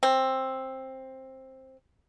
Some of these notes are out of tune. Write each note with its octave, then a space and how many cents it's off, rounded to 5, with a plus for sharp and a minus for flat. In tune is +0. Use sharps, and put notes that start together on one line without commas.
C4 +10